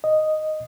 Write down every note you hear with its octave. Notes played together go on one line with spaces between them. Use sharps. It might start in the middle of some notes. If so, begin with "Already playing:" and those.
D#5